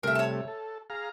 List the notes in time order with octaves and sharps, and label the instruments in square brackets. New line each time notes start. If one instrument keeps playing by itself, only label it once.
[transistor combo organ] C3 G3 A3 [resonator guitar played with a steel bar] A#4 E5
[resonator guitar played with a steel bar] C#5 A5
[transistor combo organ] A4
G#4 F5 A#5